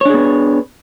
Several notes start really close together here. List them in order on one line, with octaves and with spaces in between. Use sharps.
C#5 D4 G#4 B3